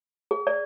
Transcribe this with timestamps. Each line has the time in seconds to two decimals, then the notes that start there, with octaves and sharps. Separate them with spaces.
0.31 G#4
0.47 D5